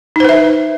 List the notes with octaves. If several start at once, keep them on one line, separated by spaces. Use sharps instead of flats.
D#4 B4 C5 E5